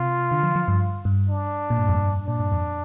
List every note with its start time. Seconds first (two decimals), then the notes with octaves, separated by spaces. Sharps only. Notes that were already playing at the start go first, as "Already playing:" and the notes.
Already playing: C3 F4
0.32 D3
0.43 F3
0.56 F3
0.68 G2
1.05 G2
1.29 D4
1.70 A#2
1.78 G2
1.88 F2
1.95 G2
2.27 A#2 D4
2.40 G2
2.52 F2